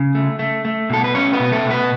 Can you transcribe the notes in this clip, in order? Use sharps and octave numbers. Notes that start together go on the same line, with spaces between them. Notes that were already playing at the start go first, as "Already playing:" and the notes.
Already playing: C#3
A3
A3
A3
B2 A4
B4
A3 C#4 C#5
B3 B4
B2
A3 A4
B2
B3 B4